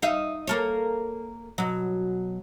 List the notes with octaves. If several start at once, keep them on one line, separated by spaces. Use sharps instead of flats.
D#4 E5 F5
A#3 A4 C#5
B2 F#3